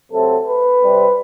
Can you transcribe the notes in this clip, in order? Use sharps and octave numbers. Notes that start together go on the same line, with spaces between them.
C3 F#3 A3 C4 A4
B4
C3 G3 C4